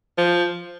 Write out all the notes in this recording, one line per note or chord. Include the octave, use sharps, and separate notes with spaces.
F3